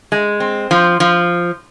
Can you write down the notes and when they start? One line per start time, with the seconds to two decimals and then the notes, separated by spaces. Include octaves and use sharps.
0.12 G#3
0.40 C4
0.71 F3
1.00 F3